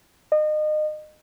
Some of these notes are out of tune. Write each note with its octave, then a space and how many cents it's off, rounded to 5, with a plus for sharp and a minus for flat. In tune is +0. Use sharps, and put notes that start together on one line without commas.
D#5 -30